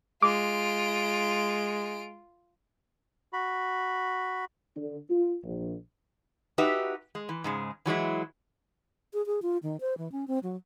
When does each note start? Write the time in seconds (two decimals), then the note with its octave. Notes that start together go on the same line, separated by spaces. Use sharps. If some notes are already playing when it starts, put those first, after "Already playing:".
0.23 G#3 F4 D6 D7
3.33 F#4 B5
4.77 D3
5.10 F4
5.44 A#1
6.58 D#4 F#4 G4 B4 E5
7.15 G#3
7.29 E3
7.44 G#2 C#3 G#3
7.86 E3 F#3 G#3 E4
9.14 G#4
9.26 G#4
9.42 F4
9.63 D#3
9.81 C5
9.98 E3
10.12 C#4
10.28 C4
10.43 F#3